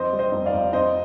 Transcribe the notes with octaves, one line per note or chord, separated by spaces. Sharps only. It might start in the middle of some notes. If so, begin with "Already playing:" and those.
Already playing: F2 C5 D#5
G3
C5 D#5
F1
D5 F5
F1
F2 C5 D#5